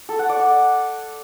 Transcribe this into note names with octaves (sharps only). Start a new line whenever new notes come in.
A4
F#5
D5
D5